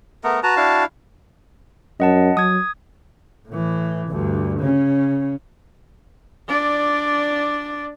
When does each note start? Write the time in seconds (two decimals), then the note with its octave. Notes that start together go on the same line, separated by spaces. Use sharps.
0.24 A3 B3 A#4
0.43 F#4 B4 A5 A#5
0.57 D4 E4 F5
2.00 F#2 D#5 F#5 A5
2.37 F#3 D#6 G#6
3.49 A2 E3
4.07 D2 G2
4.59 C#3 C#4
6.47 D4 D5